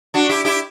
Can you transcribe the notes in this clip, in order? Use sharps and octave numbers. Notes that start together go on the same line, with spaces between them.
D4 F#4
E4 G4
E4 G4